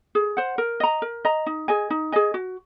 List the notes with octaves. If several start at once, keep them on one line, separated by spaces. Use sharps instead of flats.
G#4
C5 F#5
A#4
D#5 A#5
A#4
D#5 A#5
D#4
G#4 D#5 G#5
D#4
G#4 D#5 G#5
F#4